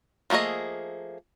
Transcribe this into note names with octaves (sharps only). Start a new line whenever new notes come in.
F3 A3 A#3 G#4 D#5